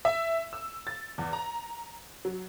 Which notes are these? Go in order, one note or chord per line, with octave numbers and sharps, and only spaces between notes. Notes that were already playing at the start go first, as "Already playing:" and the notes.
E5
E6
A6
E2
A#5
F#3